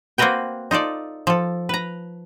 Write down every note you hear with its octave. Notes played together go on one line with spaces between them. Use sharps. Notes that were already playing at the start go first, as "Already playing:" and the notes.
A#3 C4 F#4 A#4 B4 G5
D#4 F4 A4 D5
F3 A4
B4 A#5